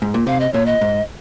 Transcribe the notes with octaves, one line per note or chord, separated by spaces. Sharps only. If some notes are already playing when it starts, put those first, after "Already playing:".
G#2
A#2
C3 F5
D#5
A#2 C#5
D#5
G#2